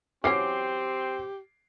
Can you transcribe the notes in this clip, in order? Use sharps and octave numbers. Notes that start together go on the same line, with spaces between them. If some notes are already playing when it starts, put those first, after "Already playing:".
E3 F#3 C4 C#4 G4 D6 C7